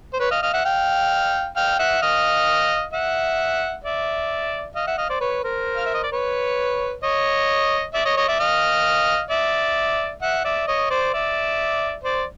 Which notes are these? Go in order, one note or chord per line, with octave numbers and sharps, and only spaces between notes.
C5
B4 C#5
D#5 F5
D#5 F5
E5 F#5
F5 G5
F5 G5
E5 F#5
D#5 F5
E5 F#5
D5 E5
D#5 F5
E5 F#5
D#5 F5
C5 D5
B4 C#5
A#4 C5
F5
E5
D#5
D5
B4 C#5
C#5 D#5
D5 E5
C#5 D#5
C#5 D#5
D5 E5
D#5 F5
D5 E5
E5 F#5
D5 E5
C#5 D#5
C5 D5
D5 E5
C5 D5